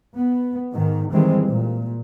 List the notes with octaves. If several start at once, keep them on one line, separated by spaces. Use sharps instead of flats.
B3
G#2 D#3
D#3 E3 G3 G#3 C4
A#2